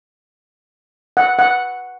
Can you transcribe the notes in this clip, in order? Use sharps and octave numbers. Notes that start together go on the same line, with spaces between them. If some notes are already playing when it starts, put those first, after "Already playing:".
F#5
F#5